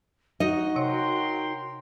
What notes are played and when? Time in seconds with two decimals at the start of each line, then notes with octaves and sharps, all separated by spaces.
0.40 D#4 F#4 D#5
0.76 C3 A#4 C#5 G5 C6